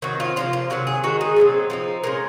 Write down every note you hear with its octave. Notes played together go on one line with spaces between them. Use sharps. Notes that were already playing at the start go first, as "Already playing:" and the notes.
D#3 F#3 C4 D#4 F#4
F4
C3 F3 A#3 F4
F4
C3 D#3 F#3 F#4
G#4
D#3 G#3 D#4 F#4
G#4
A#2 F#3 C4 D#4
F3 C4 D#4
A#2 G#3 C#4 A#4